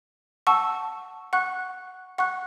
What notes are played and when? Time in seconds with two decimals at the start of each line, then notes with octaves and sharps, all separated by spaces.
0.47 F#5 A5 C#6 E6
1.33 F#5 C#6 F#6
2.18 F#5 C#6 F#6